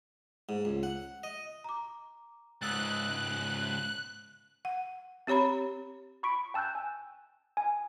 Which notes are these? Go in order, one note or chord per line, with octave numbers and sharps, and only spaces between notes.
G#2
C#2
F#5
D#5
A#5 D6
C#2 G#2 D#6 E6 F#6 A6
F#5
C4 G4 C#5 A#5 B5
B5 C#6 B6 D7
G5 A5 E6 F#6 G6
G#5
G#5